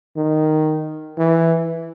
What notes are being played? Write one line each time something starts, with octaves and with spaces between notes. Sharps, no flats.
D#3
E3